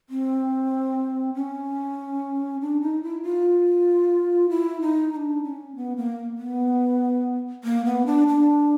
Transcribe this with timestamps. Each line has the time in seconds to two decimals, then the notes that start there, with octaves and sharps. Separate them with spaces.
0.10 C4
1.34 C#4
2.61 D4
2.81 D#4
3.03 E4
3.23 F4
4.50 E4
4.81 D#4
5.12 D#4
5.17 D4
5.44 C#4
5.76 B3
5.97 A#3
6.38 B3
7.64 A#3
7.85 B3
8.06 D4
8.27 D4